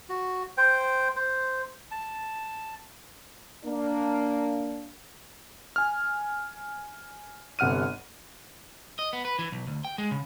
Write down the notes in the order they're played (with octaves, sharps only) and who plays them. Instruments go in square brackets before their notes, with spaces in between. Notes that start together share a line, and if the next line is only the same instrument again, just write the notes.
[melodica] F#4
C5 G5
C5
A5
[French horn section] A#3 D4
[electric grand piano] G#5 F6
G1 C3 F#5 F6 D#7
[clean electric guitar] D#5
B3
B4
E3
B1
D2
G5
G#3
C#3